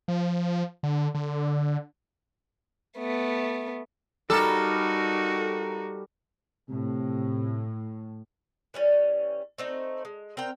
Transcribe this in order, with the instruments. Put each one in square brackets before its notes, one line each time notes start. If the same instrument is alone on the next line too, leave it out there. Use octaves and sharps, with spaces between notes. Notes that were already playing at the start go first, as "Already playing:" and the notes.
[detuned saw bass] F3
D3
D3
[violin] A3 B3
[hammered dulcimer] G3 A#4 [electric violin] D#4 F#4 [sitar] A4
[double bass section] A2 [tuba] C3
[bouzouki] E3 G3 C#4
A3 C4 D#4
G#3
C4 A#4 G5